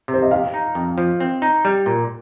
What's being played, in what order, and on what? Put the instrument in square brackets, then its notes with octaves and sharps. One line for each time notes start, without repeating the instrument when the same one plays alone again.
[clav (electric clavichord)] C3
[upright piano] C5
D#5
[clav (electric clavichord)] G4 [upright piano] F5
[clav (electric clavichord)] D#4
F2
F3
C4
D#4
G3
A#2